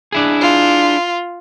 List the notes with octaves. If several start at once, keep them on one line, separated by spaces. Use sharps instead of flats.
D4 E4 G#4
F4